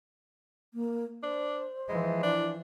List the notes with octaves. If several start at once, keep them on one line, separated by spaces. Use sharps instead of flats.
A#3
D4 C5
E3 F3 G#3
D4 E4